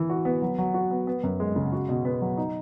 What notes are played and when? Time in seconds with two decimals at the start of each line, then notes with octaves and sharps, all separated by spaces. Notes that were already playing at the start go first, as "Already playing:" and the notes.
Already playing: E3
0.10 F#4
0.25 B3
0.42 F#3
0.58 F#3
0.74 F#4
0.91 B3
1.07 B3
1.24 F#2
1.40 G#3
1.56 C#3
1.72 F#4
1.89 B2
2.05 B3
2.22 F#3
2.37 D#4